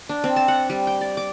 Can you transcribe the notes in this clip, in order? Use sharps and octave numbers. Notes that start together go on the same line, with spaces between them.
D4
C4
A5
F#5
G3
G5
D5
D6